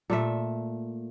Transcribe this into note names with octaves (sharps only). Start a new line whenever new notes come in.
A#2 A3 E5